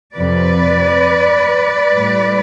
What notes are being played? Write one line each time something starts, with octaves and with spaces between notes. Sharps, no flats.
F2 C3 F3 B4 D5
A2 G3